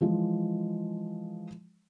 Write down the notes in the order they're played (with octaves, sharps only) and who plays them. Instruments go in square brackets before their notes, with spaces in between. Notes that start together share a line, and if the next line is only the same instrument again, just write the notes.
[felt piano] E3 F3 G#3